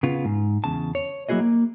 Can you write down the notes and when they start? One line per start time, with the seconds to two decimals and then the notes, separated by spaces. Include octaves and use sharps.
0.03 C#3 B3 F4
0.25 G#2
0.64 E2 C#3 A5
0.95 C#5
1.29 F#3 A#3 E4 F#4 G#4 D#5
1.40 A#3